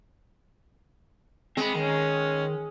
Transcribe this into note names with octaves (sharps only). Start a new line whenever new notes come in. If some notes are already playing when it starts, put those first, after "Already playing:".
G#3 C4 B5
D#3 C#4